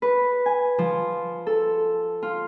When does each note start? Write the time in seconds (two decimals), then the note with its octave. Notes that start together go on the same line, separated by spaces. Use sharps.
0.02 B4
0.46 G#5
0.79 F3
1.47 A4
2.23 F4